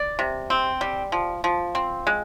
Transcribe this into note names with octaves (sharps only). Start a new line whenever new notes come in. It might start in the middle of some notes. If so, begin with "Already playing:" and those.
Already playing: D5
C3
C4
G3
F3
F3
C4
G#3